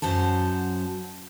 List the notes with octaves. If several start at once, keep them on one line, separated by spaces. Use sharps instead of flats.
F#2 F#3 C5 A5